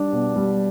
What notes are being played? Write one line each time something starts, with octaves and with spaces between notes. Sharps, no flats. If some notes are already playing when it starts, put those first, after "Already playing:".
Already playing: G3 D4 G4
B2
G3